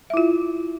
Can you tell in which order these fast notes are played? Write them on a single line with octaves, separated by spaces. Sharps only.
E5 E4 F4